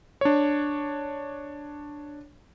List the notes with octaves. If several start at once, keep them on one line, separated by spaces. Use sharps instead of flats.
D4 C#5